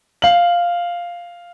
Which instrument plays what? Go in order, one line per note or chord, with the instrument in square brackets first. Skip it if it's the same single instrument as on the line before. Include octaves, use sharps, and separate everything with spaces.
[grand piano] F5 F#7